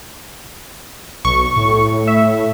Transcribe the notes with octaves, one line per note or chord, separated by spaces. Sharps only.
B1 C#6
A2
E5